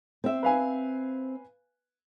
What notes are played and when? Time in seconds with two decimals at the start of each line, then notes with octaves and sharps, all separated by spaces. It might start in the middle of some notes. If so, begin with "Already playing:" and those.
0.24 C4 E5
0.43 B4 F5 G#5